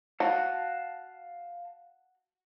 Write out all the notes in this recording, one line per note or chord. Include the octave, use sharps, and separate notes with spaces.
F#4 F5 A5